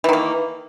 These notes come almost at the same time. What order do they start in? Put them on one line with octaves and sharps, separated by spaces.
E3 D#3 A#3